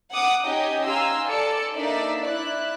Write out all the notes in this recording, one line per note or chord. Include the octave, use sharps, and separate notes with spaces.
F#5 D6 D#6
C#4 D#4 G4 D#5 G5 G#5
F5 G#5 A#5 C6 E6
A4 D5 A5 C#7
A#3 D4 D#4 D5 E5
E4 D5 F#6